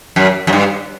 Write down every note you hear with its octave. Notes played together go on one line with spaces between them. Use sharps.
F#2
F#2
G2